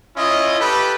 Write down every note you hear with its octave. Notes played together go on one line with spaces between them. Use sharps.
C#4 E4 F4 D#5
G4 A4 B4 B5